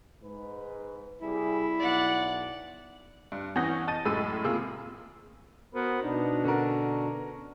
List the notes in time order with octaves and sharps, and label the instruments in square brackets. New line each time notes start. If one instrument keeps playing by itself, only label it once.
[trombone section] G#2 B4
[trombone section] C3 G3 G#4 [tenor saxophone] E4
[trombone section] B1 [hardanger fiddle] D5 F#5
[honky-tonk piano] G2
E3 C#4 F#5 D#6 G6 A#6
D#5 A5 A6 D#7
F#2 A2 G#3 E6 D#7
C3 A#3 F4 G#4 E6
[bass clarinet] B3 [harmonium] F#4 A#4 C5
[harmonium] B2 D4 [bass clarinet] D#4
[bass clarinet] D3 [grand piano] C#4 F#4 A#4